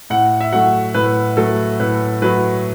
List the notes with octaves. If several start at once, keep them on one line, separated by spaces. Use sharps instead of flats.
A2 F#5
E5
F#3 A3 F#5
A2 B4
F#3 A3 A4
A2 B4
F#3 A3 B4